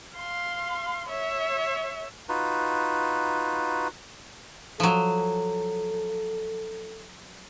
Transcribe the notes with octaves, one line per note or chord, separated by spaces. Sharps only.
F5 C6
C#5 E5
D#4 F4 F#4 B4
F3 F#3 A4